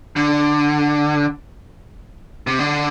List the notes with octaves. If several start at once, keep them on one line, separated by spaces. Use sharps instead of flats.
D3
C3
D3